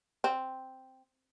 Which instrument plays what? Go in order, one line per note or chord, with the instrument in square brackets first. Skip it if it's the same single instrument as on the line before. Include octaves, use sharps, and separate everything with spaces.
[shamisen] C4